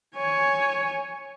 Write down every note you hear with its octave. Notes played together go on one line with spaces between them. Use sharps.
C#5 G#5